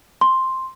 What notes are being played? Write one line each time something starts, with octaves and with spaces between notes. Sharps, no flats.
C6